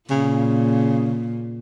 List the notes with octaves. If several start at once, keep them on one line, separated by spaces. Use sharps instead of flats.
A#2 C#3